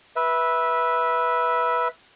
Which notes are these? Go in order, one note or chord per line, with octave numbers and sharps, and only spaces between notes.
B4 E5